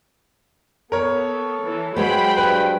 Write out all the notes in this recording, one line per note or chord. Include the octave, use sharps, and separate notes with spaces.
B3 A4 A#4 C#5
E3
F#3 G#3 B3 C5 G5 B5
G2 B4